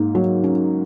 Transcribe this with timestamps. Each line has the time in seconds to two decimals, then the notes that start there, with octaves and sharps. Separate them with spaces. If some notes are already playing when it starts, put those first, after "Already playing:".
Already playing: G#2 A#3
0.15 F#3
0.44 C#4